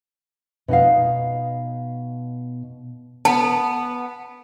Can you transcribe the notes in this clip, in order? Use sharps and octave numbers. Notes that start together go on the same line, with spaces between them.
B2 D#4 D#5 F5
B3 A5